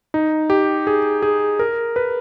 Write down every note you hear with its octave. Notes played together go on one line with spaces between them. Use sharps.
D#4
G4
G#4
G#4
A#4
B4